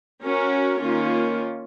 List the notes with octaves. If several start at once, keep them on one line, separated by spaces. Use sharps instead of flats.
C#4 F#4 A#4
D#3 A#3 C#4 F4